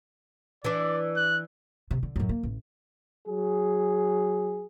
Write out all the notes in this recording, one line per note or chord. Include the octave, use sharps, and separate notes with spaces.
E3 D4 D5
F#6
C3
D3
F#2 A2
A#3
A1
F#3 G#4